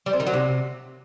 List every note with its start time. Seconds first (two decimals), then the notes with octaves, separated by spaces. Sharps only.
0.06 G3
0.13 C4
0.20 D#3
0.27 F#3
0.33 C3